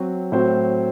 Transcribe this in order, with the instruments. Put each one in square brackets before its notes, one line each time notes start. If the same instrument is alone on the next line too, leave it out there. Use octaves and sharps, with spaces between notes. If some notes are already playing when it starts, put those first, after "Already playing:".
Already playing: [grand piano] F#3 C4 F#4
A2 F#3 C4 F#4 C5